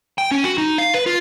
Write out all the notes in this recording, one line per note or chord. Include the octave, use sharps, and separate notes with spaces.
G5
C#4
F#4
D#4
F5
B4
F4